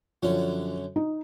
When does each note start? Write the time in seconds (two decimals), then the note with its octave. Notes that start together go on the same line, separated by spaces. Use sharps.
0.23 F#2 D3 F3 C#4 F#4
0.96 D#4